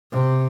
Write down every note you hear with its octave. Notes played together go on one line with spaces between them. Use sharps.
C3